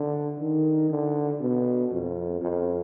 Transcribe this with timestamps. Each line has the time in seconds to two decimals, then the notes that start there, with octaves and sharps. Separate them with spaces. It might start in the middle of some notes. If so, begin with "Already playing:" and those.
Already playing: D3
0.40 D#3
0.90 D3
1.40 B2
1.91 F2
2.41 F2